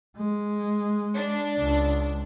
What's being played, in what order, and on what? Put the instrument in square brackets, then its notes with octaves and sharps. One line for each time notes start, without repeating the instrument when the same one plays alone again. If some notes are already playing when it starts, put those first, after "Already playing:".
[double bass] G#3
[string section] D4
[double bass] C#2